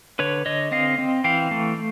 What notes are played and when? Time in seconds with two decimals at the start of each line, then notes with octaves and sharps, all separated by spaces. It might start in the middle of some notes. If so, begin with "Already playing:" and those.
0.19 D3 B4 C#5
0.46 D3 C#5 D#5
0.71 C4 D#5 F5
0.98 C4
1.24 E3 F5 G5
1.51 A3